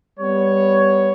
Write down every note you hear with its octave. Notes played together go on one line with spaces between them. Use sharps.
G3 B3 C#5